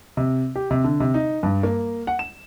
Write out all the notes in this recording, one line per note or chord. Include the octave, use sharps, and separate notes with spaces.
C3
G4
C3
D3
C3
D#4
G2
A#3
F#5
E7